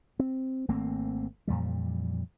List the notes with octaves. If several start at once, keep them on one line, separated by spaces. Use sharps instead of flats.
C4
G#1 A3 A#3 C4
F2 A#2 E3 G3